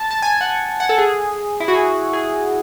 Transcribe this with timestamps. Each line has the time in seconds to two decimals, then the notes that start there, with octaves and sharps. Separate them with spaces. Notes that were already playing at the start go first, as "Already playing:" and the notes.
Already playing: A5
0.11 A5
0.22 G#5
0.41 F#5
0.80 F#5
0.89 A4
0.98 G#4
1.60 E4
1.68 F#4
1.74 G#4
2.13 G#4